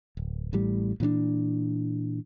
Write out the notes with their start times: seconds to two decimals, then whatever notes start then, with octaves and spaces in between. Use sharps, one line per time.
0.17 D1
0.53 A1 A2 G3
1.00 A#2 E3 C4 D4